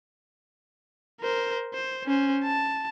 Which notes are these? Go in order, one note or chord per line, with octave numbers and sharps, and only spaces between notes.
A#4 C5
C5
C#4 C5
A5